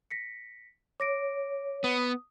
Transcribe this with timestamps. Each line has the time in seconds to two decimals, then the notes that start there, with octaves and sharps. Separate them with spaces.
0.11 A#6 B6 C#7
1.00 C#5 D6 A#6 D7
1.84 B3 D#6